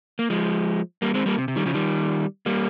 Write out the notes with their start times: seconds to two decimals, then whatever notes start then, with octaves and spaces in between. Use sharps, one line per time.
0.19 A#3
0.30 F3 G#3
1.02 G3 A#3
1.14 G#3 C4
1.26 G3 A#3
1.38 C3
1.48 C3
1.56 D#3 G3
1.66 C#3 F3
1.74 D#3 G3
2.46 G3 A#3